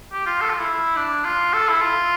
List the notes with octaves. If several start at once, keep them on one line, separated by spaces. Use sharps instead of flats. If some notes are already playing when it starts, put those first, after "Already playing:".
G4
F4
A4
F4
E4
D4
F4
A4
E4
F4